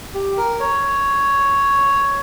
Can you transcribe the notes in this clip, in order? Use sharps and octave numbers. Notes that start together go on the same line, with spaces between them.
G4
A#4
C#5